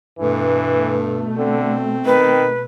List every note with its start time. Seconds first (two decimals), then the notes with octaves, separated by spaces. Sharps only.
0.19 G2 B2 E3 A3
1.37 D3 C4
2.06 D#3 B4